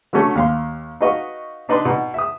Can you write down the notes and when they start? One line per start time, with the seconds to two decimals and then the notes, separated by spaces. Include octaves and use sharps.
0.13 D3 F#3 A3 C#4 A4
0.35 D#2 F5 C6
1.01 D#4 F#4 B4 D#5 F5 C#6
1.69 D4 D#4 B4 D5 C6
1.85 B2 D#4
2.14 E5 D#6